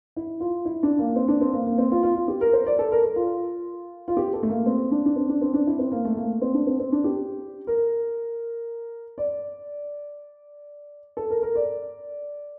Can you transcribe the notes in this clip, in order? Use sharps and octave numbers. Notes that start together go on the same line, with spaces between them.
E4
F4
E4
D4
A#3
C4
D4
C4
A#3
A#3
C4
F4
F4
F4
G4
A#4
C5
D5
A4
A#4
A#4
F4
F4
G4
A4
A3
A#3
C4
D4
D4
C4
D4
C4
D4
E4
C4
A#3
A3
A#3
C4
D4
C4
C4
D4
G4
A#4
D5
A4
A#4
A#4
D5